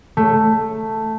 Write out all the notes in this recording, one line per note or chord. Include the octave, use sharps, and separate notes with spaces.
A3